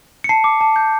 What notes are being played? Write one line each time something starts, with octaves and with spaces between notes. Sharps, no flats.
C#7
A5 C7
D6
A5
G6